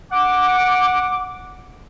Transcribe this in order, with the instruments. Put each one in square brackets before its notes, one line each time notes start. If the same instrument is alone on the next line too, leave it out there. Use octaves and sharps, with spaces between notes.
[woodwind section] F#5 D6